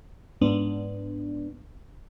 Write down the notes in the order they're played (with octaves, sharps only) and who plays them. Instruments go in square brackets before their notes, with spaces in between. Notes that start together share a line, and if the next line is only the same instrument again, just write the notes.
[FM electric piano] G#2 B3 D4